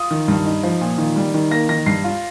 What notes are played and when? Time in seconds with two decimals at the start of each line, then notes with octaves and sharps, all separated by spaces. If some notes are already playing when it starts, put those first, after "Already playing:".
Already playing: F4 D#6
0.11 D#3
0.28 G2
0.46 D#4
0.63 F3
0.81 A#2
0.98 D#3
1.16 G3
1.34 D#3
1.51 A#3 A#6
1.69 D#3 A#6
1.86 G2 C7
2.04 F4